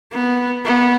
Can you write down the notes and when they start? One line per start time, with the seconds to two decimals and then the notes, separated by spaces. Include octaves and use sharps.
0.12 B3
0.65 B3